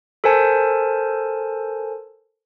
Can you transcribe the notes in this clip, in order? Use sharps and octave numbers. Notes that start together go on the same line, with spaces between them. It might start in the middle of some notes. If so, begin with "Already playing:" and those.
A4 A#4 C5 G#5 A5